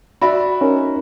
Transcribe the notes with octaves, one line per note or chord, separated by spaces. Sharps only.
F#4 D5 E5 B5
C#4 D#4 A#4